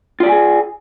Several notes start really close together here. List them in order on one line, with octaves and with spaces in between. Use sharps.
F4 D5 G4 G#5 G#4